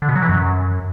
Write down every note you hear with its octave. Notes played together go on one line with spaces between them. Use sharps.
D3
B2
F#3
E3
F#2